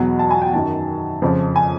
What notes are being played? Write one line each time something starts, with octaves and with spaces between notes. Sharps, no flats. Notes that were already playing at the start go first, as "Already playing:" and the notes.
Already playing: E2 B2 F#3
A5
G#5
G5
F#2 D#3 F#3 A5
F2 C#3 F3
G#5